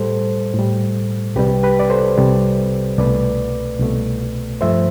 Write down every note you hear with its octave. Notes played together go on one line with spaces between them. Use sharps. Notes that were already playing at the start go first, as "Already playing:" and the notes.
Already playing: A2 G3 A4 C5
A2 G3
C2 C3 G3 G4 B4
G4 B4
D5
A4 C5
C2 C3 G3
C2 B2 A3 B4 D5
C2 B2 A3
G2 F3 A3 C5 E5